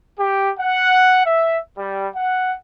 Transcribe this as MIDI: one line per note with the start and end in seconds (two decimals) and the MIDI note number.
0.18 0.49 67
0.59 1.24 78
1.26 1.57 76
1.76 2.07 55
2.15 2.55 78